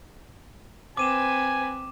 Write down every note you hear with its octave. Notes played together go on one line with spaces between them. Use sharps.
C4 B4 G#5 D6 D#7 E7